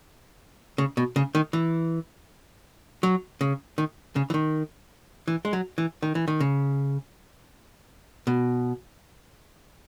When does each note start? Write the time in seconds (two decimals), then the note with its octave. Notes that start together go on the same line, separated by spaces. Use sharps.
0.78 C#3
0.97 B2
1.16 C#3
1.35 D#3
1.53 E3
3.03 F#3
3.41 C#3
3.78 D#3
4.16 C#3
4.30 E3
4.34 D#3
5.28 E3
5.45 G#3
5.53 F#3
5.78 E3
6.03 D#3
6.15 E3
6.28 D#3
6.40 C#3
8.27 B2